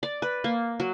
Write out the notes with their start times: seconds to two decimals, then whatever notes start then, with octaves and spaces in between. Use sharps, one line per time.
0.03 D5
0.22 B4
0.44 A#3
0.80 F#3